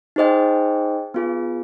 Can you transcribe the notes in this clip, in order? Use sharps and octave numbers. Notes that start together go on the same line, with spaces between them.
D#4 G#4 C5 D#5 G5
B3 F4 G#4